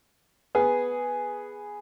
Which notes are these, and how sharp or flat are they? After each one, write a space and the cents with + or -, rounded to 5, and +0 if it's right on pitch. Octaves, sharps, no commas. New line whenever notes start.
B3 +0 G#4 +0